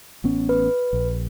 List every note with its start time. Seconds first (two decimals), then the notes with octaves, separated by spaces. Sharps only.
0.24 A1 B3 C#4
0.49 B4
0.93 A#1